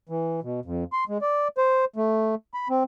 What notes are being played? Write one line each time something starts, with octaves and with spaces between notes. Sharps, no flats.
E3
B2
F2
C6
G#3
D5
C5
A3
B5
C4